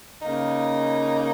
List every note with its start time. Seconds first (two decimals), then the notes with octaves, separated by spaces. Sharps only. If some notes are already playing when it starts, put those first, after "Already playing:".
0.21 C#3 A#3 D#4